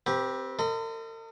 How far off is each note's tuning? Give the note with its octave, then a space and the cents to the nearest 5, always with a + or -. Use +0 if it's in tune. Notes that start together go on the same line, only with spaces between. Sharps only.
C4 +0 G4 +5 B4 -35
A#4 -45 D#5 +0 C6 -45